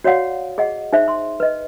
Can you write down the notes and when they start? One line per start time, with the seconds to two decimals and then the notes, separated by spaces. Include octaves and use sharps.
0.04 F#4 C#5 D5 F5 F#5
0.58 G#4 D#5 F#5
0.93 D#4 G#4 C5 E5
1.08 C6
1.40 B4 D#5